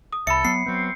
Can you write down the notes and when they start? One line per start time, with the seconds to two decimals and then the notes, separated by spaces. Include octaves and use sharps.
0.13 D#6
0.27 C2 A4 E5 B5 C#7
0.45 F#3 B3 C7
0.66 F#3 B3 C4